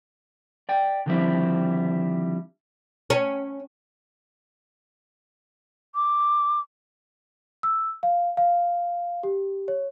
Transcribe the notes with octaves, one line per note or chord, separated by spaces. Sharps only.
D5 G5
D3 D#3 F3 G3 C4 E4
C#4
D6
E6
F5
F5
G4
C#5